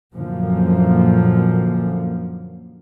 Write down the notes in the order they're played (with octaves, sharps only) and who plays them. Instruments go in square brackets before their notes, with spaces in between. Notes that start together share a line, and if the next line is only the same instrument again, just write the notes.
[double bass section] F#2 A#2 D3 F3 A#3